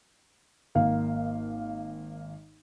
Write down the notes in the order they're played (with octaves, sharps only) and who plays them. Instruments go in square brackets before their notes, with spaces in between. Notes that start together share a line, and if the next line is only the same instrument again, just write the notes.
[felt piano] G#1 A#3 F5